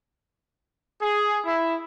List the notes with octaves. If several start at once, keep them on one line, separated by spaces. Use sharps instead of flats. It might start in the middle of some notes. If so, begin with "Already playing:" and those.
G#4
E4